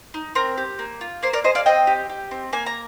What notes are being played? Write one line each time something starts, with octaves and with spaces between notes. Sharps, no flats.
D#4
C4 A#4
G4
A#3
F4
A#3 C5
A#4 D5
G#4 C5 D#5
D5 F5
C4 D#5 G5
G4
G4
C4
A#3 G#5
A#5